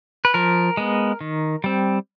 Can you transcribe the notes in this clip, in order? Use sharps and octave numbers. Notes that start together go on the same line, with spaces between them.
B4
F3 A#4
G#3 B3
D#3
G3 C4